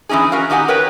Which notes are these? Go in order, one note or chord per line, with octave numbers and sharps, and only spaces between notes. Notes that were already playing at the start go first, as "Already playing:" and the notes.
E3 G3 C#4 D#4 G#4
C#4 F#4 A#4 F5
D#3 D#4 G4 F#5 G#5
G4 A#4 B4 C#5 G5